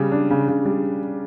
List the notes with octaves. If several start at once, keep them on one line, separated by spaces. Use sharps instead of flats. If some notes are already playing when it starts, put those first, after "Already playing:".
Already playing: C#3 G3
D4
C#3
C#3
G3